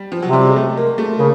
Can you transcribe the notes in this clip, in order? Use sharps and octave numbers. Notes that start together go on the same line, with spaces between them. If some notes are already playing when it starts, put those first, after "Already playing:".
Already playing: G3
F3
C3 F#3
G3
G#3
A3
A#3
A3
C#3 A#3